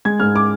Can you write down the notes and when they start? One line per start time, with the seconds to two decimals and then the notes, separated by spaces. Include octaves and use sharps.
0.05 G#3 G#6
0.20 G#2 F6
0.36 D6